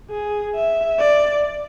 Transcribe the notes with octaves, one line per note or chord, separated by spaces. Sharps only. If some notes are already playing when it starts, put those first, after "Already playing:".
G#4
E5
D5